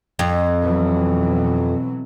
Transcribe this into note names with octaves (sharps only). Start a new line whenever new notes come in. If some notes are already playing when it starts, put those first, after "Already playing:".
F2
B2 E3 F#3